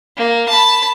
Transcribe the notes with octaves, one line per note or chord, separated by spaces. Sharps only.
A#3
A5 B5